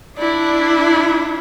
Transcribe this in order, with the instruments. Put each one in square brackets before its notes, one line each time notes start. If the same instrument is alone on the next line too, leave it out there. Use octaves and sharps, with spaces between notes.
[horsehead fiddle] D4 E4 [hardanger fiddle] D5